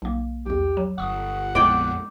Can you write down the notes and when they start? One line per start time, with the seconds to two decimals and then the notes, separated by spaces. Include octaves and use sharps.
0.02 B1 A#3
0.46 B1 E2 G4
0.77 F#3
0.98 G1 F#5 C#6 D#6
1.55 A#1 F2 G#3 B3 E4 D5 G5